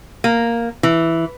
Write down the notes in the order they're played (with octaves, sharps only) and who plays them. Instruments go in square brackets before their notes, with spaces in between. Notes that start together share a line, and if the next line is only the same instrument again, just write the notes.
[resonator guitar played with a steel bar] A#3
E3